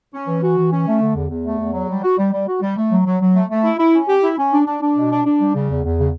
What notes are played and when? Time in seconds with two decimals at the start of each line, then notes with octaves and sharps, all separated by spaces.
0.13 C#4
0.27 E3
0.43 F#4
0.58 E3
0.72 C#4
0.87 A3
1.01 D3
1.15 E2
1.29 E2
1.44 A3
1.59 E2
1.73 F#3
1.89 G3
2.03 F#4
2.18 G3
2.32 G3
2.48 F#4
2.61 G3
2.77 A3
2.91 F#3
3.05 F#3
3.21 F#3
3.35 A3
3.50 A3
3.64 E4
3.78 E4
3.93 C#4
4.08 G4
4.23 E4
4.38 C#4
4.52 D4
4.66 D4
4.81 D4
4.95 B2
5.11 D4
5.25 D4
5.39 G3
5.54 C#3
5.69 E2
5.84 E2
5.99 C#3